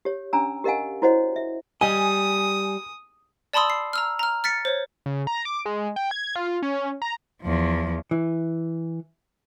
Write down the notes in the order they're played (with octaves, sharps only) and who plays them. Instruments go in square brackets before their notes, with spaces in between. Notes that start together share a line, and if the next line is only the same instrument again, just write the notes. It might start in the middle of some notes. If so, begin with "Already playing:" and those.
[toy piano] G4 C#5
C#4 D4 G#5 A#5 E6
G4 A#4 D#5 F5 F#5 G#5
E4 F#4 C5 C#5 D#5 F#5
E5
[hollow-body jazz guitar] G3 D#5 [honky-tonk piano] G#5 [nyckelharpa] D#6
[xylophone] D5 A5 B5 C6 D#6 E6
C7
A#5 E6 F6
A#5 F6
F6 A6 B6 C#7
C5 C#5
[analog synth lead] C#3
A#5
D6
G#3
G5
G#6
F4
C#4
A#5
[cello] E2 F3
[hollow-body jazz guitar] E3